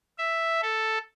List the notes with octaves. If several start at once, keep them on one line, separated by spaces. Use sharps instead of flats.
E5
A4